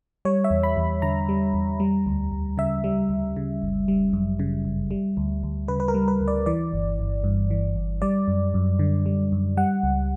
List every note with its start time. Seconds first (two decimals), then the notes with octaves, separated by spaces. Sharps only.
0.25 G3 C#5
0.44 E5
0.50 E2
0.63 B5
0.77 E2
1.02 D3 A#5
1.29 G3
1.54 E2
1.80 G3
2.07 D2
2.32 D2
2.58 C#3 E5
2.84 G3
3.10 D2
3.36 C#3
3.62 G1
3.88 G3
4.13 F#2
4.39 C#3
4.65 G1
4.91 G3
5.17 D2
5.43 D2
5.68 C#3 B4
5.80 B4
5.88 A#4
5.94 G3
6.08 B4
6.21 D2
6.28 D5
6.46 E3 D5
6.73 G1
6.99 G1
7.24 G2
7.50 E3
7.76 G1
8.02 G3 D5
8.28 F#2
8.54 F#2
8.79 D3
9.06 G3
9.32 F#2
9.57 G3 F#5
9.83 C#2